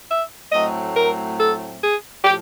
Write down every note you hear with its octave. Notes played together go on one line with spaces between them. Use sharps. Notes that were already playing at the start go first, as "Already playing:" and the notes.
E5
A2 F#3 A3 C4 D#5
A#4
A4
G#4
A2 F3 G4